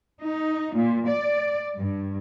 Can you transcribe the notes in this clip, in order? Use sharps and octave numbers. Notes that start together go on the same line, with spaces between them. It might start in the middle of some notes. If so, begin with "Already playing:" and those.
D#4
A#2
D5
G2